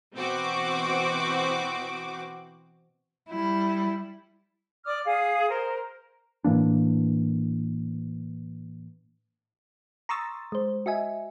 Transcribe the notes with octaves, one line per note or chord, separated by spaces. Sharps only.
B2 E3 C4 F#4 D6
G3 E4
D5 D6 D#6 F6
G#4 F5 D#6
A#4 C5
A2 E3 A#3 D4
A#5 C6 C#6 D#6 E6 A6
G#3 C5
F#4 D#5 E5 G#5